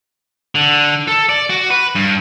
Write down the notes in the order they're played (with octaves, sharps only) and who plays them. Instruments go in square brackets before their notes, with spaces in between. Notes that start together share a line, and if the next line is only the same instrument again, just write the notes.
[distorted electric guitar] D3
A4
D5
F#4
B4
G2